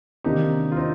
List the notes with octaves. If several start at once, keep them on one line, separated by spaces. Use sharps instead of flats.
C3 D#3 A#3 D4 D#4 G4
F4
C4 D#4